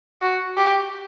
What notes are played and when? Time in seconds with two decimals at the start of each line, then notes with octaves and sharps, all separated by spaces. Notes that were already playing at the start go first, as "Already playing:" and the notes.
0.22 F#4
0.58 G4